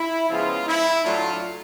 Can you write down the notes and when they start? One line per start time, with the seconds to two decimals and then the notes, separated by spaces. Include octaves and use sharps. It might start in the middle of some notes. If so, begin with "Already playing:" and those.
Already playing: E4
0.30 C#3 F3 G#3 B3 F4
0.67 E4
1.04 A2 F#3 A3 D4 F4